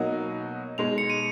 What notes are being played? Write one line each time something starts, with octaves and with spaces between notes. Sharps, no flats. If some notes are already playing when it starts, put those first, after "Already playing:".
Already playing: B2 F#3 A#3 D#4 F#4
B2 G#3 D#4 F7
C#7
D#7